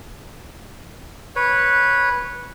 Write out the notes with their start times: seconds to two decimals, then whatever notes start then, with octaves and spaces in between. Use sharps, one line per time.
1.36 B4 C#5